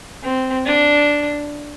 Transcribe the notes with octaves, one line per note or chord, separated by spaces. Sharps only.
C4
D4